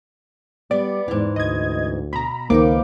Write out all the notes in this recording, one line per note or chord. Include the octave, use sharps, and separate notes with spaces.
G3 B3 D5
E2 G#2 E3
D2 D#5 G#6
B2 A#5 B5
C#2 D#3 F3 A#3 D#4 B4 D6